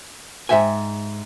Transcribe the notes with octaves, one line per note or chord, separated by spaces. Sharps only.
G#2 E3 E5 G5 G#5